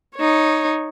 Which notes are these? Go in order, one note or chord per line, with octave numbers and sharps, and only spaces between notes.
D#4 C#5